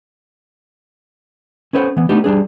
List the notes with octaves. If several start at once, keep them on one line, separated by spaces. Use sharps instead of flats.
C#4 A4 B4 C5 D#5 F#5
E3 B3
A3 B3 D4 D#4 G4
G3 D4 G#4